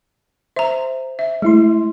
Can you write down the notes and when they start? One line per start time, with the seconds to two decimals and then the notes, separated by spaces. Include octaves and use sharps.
0.56 C5 E5 A#5
1.19 E5
1.42 G#3 A3 E4 C6